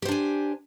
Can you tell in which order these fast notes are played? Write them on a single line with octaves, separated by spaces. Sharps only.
G4 C5 D4 G#5